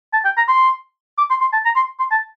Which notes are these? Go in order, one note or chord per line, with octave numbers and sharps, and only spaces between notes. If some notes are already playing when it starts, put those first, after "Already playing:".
A5
G5
A#5
C6
D6
C6
C6
A5
A#5
C6
C6
A5